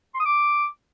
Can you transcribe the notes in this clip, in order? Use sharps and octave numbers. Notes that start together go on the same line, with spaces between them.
C6
D#6
D6